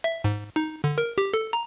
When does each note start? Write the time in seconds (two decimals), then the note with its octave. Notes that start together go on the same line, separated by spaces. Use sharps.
0.04 E5
0.24 G#2
0.56 D#4
0.84 D3
0.98 A#4
1.18 G4
1.34 A4
1.53 A#5